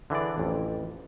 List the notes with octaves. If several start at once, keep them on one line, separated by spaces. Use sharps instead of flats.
D3 E3 G#4 D5
A1 F2